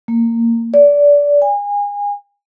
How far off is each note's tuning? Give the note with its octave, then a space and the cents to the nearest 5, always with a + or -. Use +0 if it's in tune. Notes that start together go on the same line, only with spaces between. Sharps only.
A#3 -15
D5 -20
G#5 -30